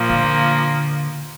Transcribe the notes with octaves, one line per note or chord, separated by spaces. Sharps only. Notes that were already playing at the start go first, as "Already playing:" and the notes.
Already playing: A#2 F3 A#3
D3